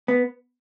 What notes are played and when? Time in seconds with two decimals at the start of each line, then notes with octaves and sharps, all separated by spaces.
0.08 B3